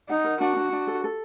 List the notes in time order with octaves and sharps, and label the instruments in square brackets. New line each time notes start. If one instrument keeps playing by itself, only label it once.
[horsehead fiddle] D#4 [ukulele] F#5
[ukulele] A#4
[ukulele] D4 [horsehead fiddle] F#4
[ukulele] D4
D4
A4
A4